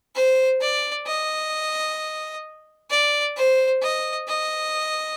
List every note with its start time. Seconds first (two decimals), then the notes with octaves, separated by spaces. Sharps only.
0.15 C5
0.61 D5
1.06 D#5
2.90 D5
3.36 C5
3.82 D#5
4.28 D#5